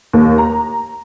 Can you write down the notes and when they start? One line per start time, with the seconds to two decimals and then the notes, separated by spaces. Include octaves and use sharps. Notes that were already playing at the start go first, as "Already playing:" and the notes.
0.13 D#2
0.38 A#5